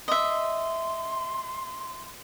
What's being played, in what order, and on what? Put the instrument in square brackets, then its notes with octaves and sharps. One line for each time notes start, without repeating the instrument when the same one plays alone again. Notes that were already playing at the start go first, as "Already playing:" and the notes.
[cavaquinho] D#5 E5 [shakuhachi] C6